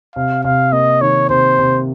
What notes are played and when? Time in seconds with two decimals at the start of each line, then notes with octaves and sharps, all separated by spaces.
0.16 C3 F5
0.44 C3 F5
0.72 A#3 D#5
1.01 D#3 C#5
1.30 C3 C5
1.59 C3